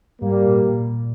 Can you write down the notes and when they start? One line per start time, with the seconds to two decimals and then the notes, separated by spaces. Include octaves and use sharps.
0.21 G#2 G3 A#3
0.46 A#2
0.69 A#2